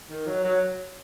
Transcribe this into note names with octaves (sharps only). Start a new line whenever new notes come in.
D#3
F#3
F#3